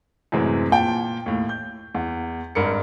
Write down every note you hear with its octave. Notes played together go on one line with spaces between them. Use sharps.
F#2 A2 C3 E3 G#3 C4
A#2 G5 A5
D#2 A2
G6
E2
G#1 G2 A#4 C#7